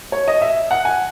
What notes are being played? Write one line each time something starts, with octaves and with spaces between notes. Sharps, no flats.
C#5
D#5
E5
F#5
G#5